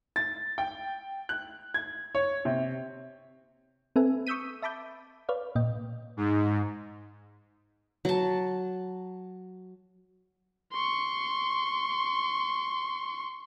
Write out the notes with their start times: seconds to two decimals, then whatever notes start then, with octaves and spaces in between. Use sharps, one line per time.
0.16 A6
0.58 G5
1.29 F#6
1.74 G#6
2.15 C#5
2.45 C3
3.96 C4 A4 B4 E5 G#5
4.27 C#6 D#6 E6 G6 B6 D#7
4.62 E5 A5 B5 D6 G6
5.29 B4 C#5 D5 F5
5.55 A#2 D#5 G5
6.17 G#2
8.05 F#3 A5
10.72 C6 C#6